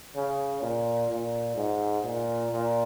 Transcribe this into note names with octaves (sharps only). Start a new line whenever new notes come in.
C#3
A#2
A#2
G#2
A#2
A#2